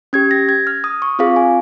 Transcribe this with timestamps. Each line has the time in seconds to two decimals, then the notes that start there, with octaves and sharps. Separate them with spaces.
0.13 C#4 G4 G#6
0.31 A#6
0.49 G#6
0.67 F6
0.84 D#6
1.02 C#6
1.19 C4 F4 G#4 F5
1.36 G#5